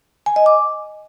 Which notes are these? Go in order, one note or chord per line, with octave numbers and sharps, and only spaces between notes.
G#5
D#5
D6